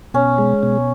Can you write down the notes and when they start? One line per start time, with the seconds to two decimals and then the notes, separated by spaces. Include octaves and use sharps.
0.14 B2 C#4
0.38 G#3
0.63 B2